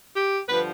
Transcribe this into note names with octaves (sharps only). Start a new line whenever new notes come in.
G4
G2 D3 F3 B4